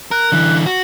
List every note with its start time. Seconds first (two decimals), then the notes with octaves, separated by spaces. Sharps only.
0.11 A#4 F#6
0.32 D3 E3
0.66 F#4